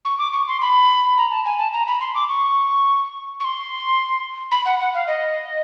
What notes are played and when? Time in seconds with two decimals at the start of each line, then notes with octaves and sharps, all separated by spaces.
0.05 C#6
0.18 D6
0.32 C#6
0.48 C6
0.61 B5
1.17 A#5
1.31 A5
1.45 G#5
1.58 A5
1.73 A#5
1.87 B5
2.00 C6
2.14 D6
2.29 C#6
3.40 C#6
3.44 C6
4.51 B5
4.65 F#5
4.80 F#5
4.94 F5
5.07 D#5